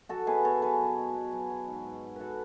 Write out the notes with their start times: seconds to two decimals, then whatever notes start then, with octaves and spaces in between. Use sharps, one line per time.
0.09 F#3 F#4 A4
0.27 B2 G#4 B4
0.44 B2 A4 C#5
0.62 F#3 G#4 B4
0.80 F#3
0.97 B2
1.15 B2
1.32 F#3
1.50 F#3
1.67 G#2
1.85 G#2
2.03 F#3
2.16 F#3 F#4 A4 B4